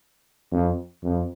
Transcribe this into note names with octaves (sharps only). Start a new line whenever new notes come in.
F2
F2